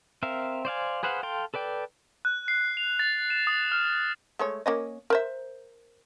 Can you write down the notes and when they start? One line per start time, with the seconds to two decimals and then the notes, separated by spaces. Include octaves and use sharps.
0.23 C4 A#4 E5 F5
0.65 C5 D5 F5 G#5
1.03 G#4 B4 C5 F5 F#5
1.23 A4 F5 G5 C6
1.54 A4 B4 D5 G5
2.25 F#6
2.48 C7
2.77 F7
2.99 A6
3.30 E7
3.47 D#6
3.72 F6
4.39 G#3 A3 C#5
4.66 A#3 C#4 D#5
5.10 A#4 C5 E5